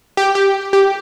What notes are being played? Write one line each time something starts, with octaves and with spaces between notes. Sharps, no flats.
G4
G4
G4